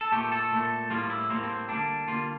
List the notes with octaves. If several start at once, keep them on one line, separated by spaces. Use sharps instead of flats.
A4
A#2 A3 G4
A4
A#2 A3
A2 G3 A#3 F4
E4
A2 G3 A#3 C4
C4
D3 G3 A#3 D4
D3 G3 A#3 F4